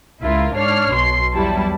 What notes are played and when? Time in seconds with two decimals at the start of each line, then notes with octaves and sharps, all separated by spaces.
0.21 C#2 E4 F4 A#4
0.56 G#2 D4 C#5 F6 C7
0.92 B1 B2 C6 C7
1.34 E2 F#3 G3 E4 A5